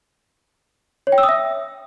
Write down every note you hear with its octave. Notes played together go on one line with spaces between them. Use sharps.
C#5
G5
E6
D#6
E5